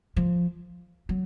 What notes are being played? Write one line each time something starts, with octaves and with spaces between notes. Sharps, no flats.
F3
F#3